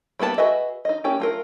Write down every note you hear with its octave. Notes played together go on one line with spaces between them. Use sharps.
G3 A#3 B3 G#4 A5
F#4 G#4 B4 D#5 E5
D#4 D#5
A#3 C#4 E4 G4
A3 F4 A#4